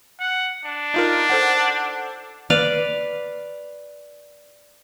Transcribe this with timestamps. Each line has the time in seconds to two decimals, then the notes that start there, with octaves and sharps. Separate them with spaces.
0.20 F#5
0.65 D4
0.94 D#4 F4 A#4
1.30 A4 C5 F#5
2.50 B4 D5 F5